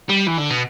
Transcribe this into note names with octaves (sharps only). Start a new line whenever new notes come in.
G3
E3
D3
B2